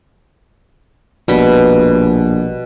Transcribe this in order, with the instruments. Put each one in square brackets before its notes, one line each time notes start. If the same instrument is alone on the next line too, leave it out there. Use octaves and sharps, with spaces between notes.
[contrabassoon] A#1 [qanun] B2 G3 B5